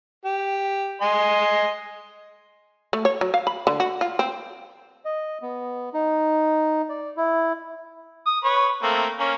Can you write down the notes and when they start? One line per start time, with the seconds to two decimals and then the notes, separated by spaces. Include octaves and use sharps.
0.25 G4
1.01 D#5 G#5 C6
2.93 A3
3.05 C#5
3.21 F#3
3.34 F5
3.47 B5
3.67 D3
3.80 F#4
4.01 F4
4.19 C4
5.05 D#5
5.42 B3
5.94 D#4
6.89 D5
7.17 E4
8.26 D#6
8.44 B4 C#5
8.83 A3 A#3 C4
9.19 A#3 C#4